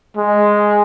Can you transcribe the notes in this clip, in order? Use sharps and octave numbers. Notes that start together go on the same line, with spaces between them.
G#3